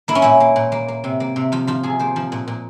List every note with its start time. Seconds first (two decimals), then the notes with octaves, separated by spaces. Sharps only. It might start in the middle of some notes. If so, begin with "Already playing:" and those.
0.08 A#3 E4
0.15 C#4
0.22 A#2 E4
0.40 A#3
0.56 A#2
0.72 A#3
0.88 A#3
1.04 C3
1.20 A#3
1.36 C3
1.52 F3 F4
1.67 F3 F4
1.83 C3 G#4
1.99 A#3 C5
2.16 F3
2.32 A#2
2.48 A#2